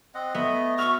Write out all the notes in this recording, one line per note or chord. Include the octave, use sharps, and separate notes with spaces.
C4 D#5 F#5
A3 B3 D#5
F#4 E5 C#6 F6